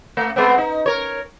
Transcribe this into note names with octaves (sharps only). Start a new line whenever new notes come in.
A3
G#3 B3 C4
D#4
A#4 C#5